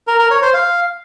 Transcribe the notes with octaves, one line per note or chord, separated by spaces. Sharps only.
A#4
A#4
C#5
C5
F5